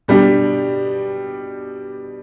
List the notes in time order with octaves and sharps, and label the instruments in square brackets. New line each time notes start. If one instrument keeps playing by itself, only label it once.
[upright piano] B2 G3 D4 G4